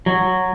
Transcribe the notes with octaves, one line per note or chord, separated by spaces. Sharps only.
F#3